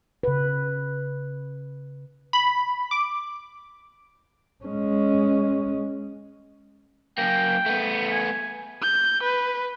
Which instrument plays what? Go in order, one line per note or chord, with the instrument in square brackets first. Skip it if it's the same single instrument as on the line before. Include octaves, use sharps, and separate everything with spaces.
[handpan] C#3 B4
[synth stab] B5
D6
[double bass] G#3 C#4
[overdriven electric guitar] F#2 A#3 [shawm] G5
[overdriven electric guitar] A3 B3
[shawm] G#5
[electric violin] G6
B4